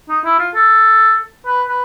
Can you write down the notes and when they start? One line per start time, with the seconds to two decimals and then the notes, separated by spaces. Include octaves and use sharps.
0.09 D#4
0.24 E4
0.39 F4
0.55 A4
1.46 B4
1.69 B4